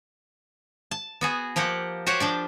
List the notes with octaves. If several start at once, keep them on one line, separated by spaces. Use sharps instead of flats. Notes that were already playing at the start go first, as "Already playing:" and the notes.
A5
B3 F#4 G#4
F3 A#3 G4 F#5
F#4 G4 C5 C#5 F#5
F3 D4 D5